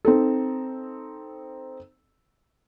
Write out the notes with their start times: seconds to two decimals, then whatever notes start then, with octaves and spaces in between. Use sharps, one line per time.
0.05 C4 D#4 A4